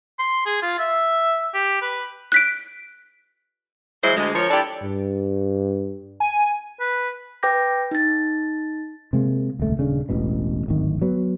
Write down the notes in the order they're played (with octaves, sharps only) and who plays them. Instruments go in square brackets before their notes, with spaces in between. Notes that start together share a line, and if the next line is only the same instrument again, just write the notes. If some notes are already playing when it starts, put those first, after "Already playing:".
[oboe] C6
G#4
F4
E5
G4
B4
[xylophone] F#6 B6 D7
[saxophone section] E3 F#3 G#3 E4 C5
D2 G#3
F3 A#4 C#5
D4 E4 G4 A4 D5
[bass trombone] G2
[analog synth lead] G#5
[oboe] B4
[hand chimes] B4 G5 D6 G6 A#6
D#4 A6
[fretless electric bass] C3 G#3 A#3
D#1 C#2 A3
D#1 C#3 D4
E1 A1 B2
D1 G#1 D#3
F#3 B3